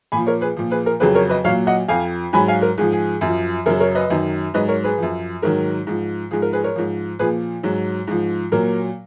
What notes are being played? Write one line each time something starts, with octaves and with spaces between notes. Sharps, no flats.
A#2 F3 G#5 B5
A#4 C#5
G#4 B4
A#2 F3
G#4 B4
A#4
F2 C#3 F#3 G#4 B4
A#4 C#5
B4 D#5
A#2 F#3 C#5 F5
D#5 F#5
F2 F3 F5 G#5
G#2 F#3 G#5 B5
F5 G#5
A#4
G#2 F3 G#4
G#4
F#2 F3
F#2 C#3 F#3 A#4
A#4 C#5
B4 D#5
F#2 D#3 F#3
G#2 F#3 B4 D#5
A#4 C#5
G#4 B4
F#2 F3
G#2 D#3 F#3 A#4
G#2 F3
G#2 F3 G#4
A#4
G#4 B4
A#4 C#5
G#2 F3
A#2 F3 G#4 B4
G#2 F#3
G#2 F3
A#2 F#3 A#4